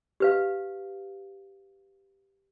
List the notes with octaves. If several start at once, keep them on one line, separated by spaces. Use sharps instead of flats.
G4 B4 F5